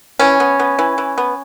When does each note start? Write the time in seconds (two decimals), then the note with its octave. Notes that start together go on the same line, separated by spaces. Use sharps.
0.19 E3 C#4
0.40 B3
0.59 B3
0.79 E3
0.98 E3
1.18 B3